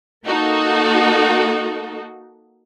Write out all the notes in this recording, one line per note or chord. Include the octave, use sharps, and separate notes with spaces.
A#3 D#4 F#4 A4